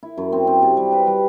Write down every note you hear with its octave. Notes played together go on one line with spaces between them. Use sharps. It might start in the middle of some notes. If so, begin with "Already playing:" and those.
E4
F#2
C4
C4
C3
G3
B4
G3